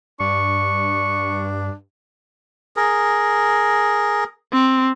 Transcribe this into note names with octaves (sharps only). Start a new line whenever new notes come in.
G2 D4 C#6
G#4 A#4
C4